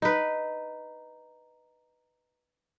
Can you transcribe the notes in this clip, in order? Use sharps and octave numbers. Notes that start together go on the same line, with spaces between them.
D#4 B4